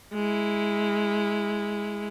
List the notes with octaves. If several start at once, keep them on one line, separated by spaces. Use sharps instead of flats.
G#3 E4